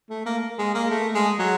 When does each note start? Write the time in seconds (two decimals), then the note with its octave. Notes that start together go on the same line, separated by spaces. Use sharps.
0.10 A3
0.26 A#3
0.58 G#3
0.74 A#3
0.90 A3
1.14 G#3
1.39 F#3